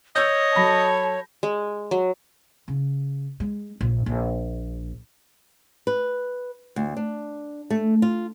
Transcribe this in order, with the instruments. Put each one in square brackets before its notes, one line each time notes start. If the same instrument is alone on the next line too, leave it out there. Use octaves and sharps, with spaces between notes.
[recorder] C#5 [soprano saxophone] D#5 [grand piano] E6 G6
[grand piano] F#3 B5 A#6 [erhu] A4
[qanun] G#3
F#3
[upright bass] C#3
G#3
A#1
A#1
[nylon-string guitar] B4
D2
D4
A3
F4